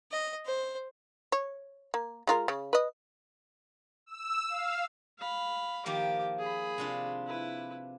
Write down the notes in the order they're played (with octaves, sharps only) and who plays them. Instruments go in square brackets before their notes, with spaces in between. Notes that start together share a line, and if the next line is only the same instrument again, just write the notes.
[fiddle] D#5
C5
[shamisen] C#5
A#3
G#3 F4 A#4
C#3
B4 D#5
[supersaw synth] E6
F5
[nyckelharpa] F5 B5
[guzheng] D#3 F3 A#3 [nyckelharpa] G4 D6
[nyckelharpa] G#4 B5
[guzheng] C3 D4 F4
[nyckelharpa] E4 B4